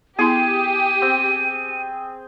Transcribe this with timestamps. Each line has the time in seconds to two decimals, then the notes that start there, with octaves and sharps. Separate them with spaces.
0.19 B3 E4 G4 G#4 C6 D#7
1.02 C4